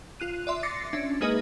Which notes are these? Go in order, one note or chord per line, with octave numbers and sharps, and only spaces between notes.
F4 F#6 D#7
D5 E5 C6
D6 A6 A#6 C7 C#7
C#4 D4 E5
G#3 A#3 D#4 G#4 B4 D#5